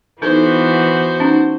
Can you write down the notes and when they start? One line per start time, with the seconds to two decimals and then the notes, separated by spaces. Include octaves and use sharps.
0.22 E3 B3 D#4 F#4 A4 B4 C5
1.20 C#4 D#4 A#5